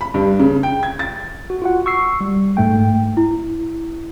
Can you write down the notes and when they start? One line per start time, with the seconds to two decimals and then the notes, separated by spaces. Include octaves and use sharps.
0.01 B5
0.14 G2
0.40 C#3
0.63 G5
0.83 G#6
0.99 A6
1.50 F#4
1.62 F4 F#4 F#5
1.86 C#6 E6 C7
2.21 G3
2.57 G#2 A3 G5
3.17 E4